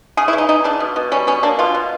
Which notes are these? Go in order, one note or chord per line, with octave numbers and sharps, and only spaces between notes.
C#3 G#4
E4
E3
D#4
E3 D#4
C#3 D4
B2
B2
G3 C#4
B2 C#4
A#3 D4
B2 F4
B2